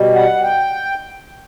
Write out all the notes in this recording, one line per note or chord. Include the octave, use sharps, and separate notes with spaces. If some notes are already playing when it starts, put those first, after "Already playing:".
Already playing: B2 G3
F#5
G5